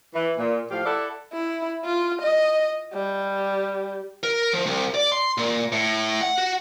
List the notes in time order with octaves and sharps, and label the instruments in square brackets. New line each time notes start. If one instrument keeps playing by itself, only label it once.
[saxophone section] E3
A#2
A2 F3 G4 F5
E4 A4 D5 E5 F#5
[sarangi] E4
F4
D#5
G3
[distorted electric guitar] A#4
F3
C2
D5
C6
A#2
A2
F#5
F#4